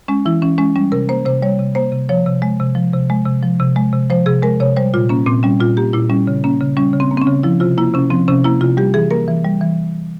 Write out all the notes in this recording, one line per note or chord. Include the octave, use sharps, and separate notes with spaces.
G#3 C#4
E3 E4
E3 C#4
G#3 C#4
G3 C#4
C3 A#4
A#3 C5
C3 C5
G3 C#5
C3
A#3 C5
C3
F3 C#5
C3
G#3
C3
F3
C3
G#3
C3
F3
C3
G#3
C3
F3 C5
C3 G#4
G#3 A#4
C3 C#5
G3 C5
A#2 F4
A#3 C#4
A#2 C4
G3 C#4
A#2 F4
A#3 G4
A#2 E4
G3 C#4
C#3
A#3 C#4
C#3
G3 C#4
C#3
C4
A#3
C4
C#4
C#3
F3 E4
C3 F4
A#3 E4
C3 C#4
F3 C4
C3 C#4
A#3 E4
C3 F4
G3 G4
E3 G#4
A#3 A#4
E3
G3
E3